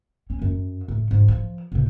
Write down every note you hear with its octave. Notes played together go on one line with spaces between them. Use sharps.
C#4
F#2
A2
G#2
F3
A2 C3